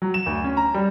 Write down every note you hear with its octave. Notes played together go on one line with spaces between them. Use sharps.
F#3
E7
D2
C#4
A#5
G3